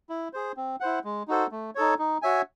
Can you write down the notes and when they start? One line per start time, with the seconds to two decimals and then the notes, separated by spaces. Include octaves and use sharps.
0.09 E4
0.33 G#4 C5
0.57 C4
0.80 E4 C5 F#5
1.04 G#3
1.28 D#4 F#4 A4 C5
1.52 A3
1.75 D#4 A4 C#5
1.99 D#4
2.22 F#4 C#5 E5 G#5